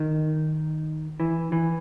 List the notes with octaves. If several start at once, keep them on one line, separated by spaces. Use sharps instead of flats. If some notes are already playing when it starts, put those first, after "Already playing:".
Already playing: D#3
E3
E3